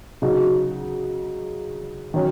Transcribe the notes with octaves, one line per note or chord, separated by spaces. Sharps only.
C#3 F#3 D#4 F#4
D#3 F#3 C#4